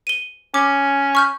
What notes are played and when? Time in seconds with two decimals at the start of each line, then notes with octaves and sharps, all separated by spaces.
0.07 D#7 G7
0.54 C#4 D6
1.15 C#6 F6 G6